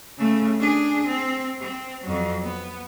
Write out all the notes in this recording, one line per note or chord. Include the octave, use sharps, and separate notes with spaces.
C#3 A3
D4 G#4
C4
C4
F2 F#3
B3